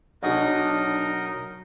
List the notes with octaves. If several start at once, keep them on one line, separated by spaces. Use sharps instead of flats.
B1 F#3 D4 D#4 G#4 A#4 D#5